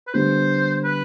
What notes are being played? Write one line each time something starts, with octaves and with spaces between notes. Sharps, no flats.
B4
D3 G3 B3 C5
B4